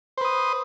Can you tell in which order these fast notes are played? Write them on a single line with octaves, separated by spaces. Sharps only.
C5 B4 D#6